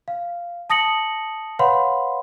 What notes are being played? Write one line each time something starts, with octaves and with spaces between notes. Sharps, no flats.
F5
A5 D#6 A#6 C#7 F#7
B4 C#5 F5 F#5 B5 C6